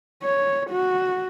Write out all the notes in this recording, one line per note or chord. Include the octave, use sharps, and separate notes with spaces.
C#5
F#4